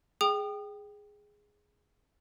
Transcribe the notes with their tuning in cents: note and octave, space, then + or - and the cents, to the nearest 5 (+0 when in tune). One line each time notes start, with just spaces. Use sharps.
G#4 +0 G5 +0 D#6 -35